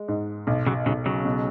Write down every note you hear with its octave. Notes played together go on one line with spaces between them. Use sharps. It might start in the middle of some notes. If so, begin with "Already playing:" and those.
Already playing: G#3
G#2
B1
C#3 F#3
B1 C#3 F#3
C#3 F#3
B2